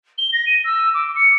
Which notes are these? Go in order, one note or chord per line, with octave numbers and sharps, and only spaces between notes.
G7
A#6
D#7
E6
D6
C#7